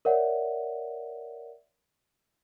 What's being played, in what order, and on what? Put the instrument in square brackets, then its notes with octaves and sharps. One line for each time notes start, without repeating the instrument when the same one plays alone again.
[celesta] A#4 C#5 D5 E5 F#5